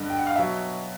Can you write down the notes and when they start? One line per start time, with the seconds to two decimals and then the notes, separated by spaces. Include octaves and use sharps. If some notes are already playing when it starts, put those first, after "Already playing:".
Already playing: G1 G2 D3 D#5
0.10 G5
0.18 F#5
0.27 F5
0.36 B2 F#3 E5